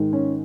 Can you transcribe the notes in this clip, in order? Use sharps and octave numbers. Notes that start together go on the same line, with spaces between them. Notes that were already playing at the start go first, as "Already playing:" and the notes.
Already playing: G#2 D#3
C#4